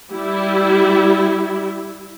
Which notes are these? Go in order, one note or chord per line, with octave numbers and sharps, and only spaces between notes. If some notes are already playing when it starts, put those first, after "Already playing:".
G3 E4